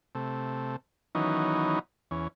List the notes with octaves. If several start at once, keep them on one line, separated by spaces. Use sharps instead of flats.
C3 A3
D#3 E3 F#3 B3 C#4 D#4
E2 C#4